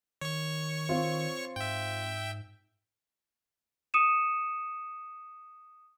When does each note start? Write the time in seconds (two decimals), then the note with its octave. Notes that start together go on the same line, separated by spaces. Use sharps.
0.21 D#3 C#5 C#6
0.89 C4 F4
1.56 G#2 E5 G5
3.94 D#6 C#7 D#7 E7